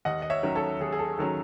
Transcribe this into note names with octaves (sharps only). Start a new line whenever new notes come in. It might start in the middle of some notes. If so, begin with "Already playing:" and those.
D#2 D#5 F#5
D#5
C#5 E5
D#3 F#3 C#4
A4 C#5
D#2 G#4
G#4
A4
D#3 F#3 C#4 A4